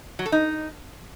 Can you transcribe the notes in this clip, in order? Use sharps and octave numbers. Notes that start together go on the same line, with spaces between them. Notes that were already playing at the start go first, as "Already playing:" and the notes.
F#3
A4
D#4